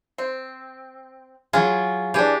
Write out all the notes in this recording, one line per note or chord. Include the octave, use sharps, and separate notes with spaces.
C4
F#3 F4 G#4
E3 D4 G4 G#4